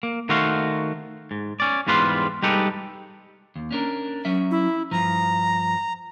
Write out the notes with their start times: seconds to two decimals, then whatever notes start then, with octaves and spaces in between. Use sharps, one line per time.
0.03 A#3
0.29 D#3 A3 F#4 C5 F5
1.31 G#2
1.60 C#4 D5
1.87 E2 G#2 G3 F4 B4 C6
2.43 G3 G#3 D#4 G4 A4 B4
3.56 D#2
3.71 C#4 D4 A#4
4.25 F#3 C#4 E5
4.51 E4
4.91 G2 F3 A#5